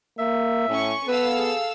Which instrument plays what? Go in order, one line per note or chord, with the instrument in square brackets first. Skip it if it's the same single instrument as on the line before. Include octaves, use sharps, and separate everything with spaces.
[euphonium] A#3 [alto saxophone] E5
[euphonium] A2 [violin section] C#4 C#6
[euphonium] B3 [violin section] A4 F5 E6 [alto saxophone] B4
[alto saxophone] G#4